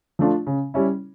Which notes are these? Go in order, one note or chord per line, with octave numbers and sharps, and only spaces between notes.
F3 A3 D4 F4
C#3
G3 C#4 E4